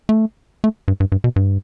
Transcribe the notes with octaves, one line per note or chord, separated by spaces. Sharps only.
A3
A3
G2
G2
G2
B2
G2